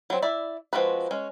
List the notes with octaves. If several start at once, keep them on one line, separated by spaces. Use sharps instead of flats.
F#3 C4
E4 D5 E5
F3 G#3 C4 F#4 B4
G#3 C#4